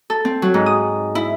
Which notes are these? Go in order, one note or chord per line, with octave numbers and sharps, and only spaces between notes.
A4
C4
F#3
G#2
D#6
E4